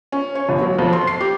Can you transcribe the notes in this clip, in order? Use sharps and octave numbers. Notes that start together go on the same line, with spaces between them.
C#4
C#5
G1
F#3
F2
C6
C7
G4